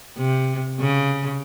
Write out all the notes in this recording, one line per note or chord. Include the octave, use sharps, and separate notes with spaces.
C3
C#3